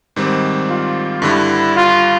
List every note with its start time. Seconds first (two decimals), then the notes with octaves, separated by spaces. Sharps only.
0.16 G#2 D#3 G3 C4
0.69 F4
1.22 G2 D3 G3 E4
1.75 F4